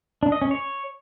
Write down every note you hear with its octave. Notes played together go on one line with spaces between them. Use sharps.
D4
D#5
C#4
C#5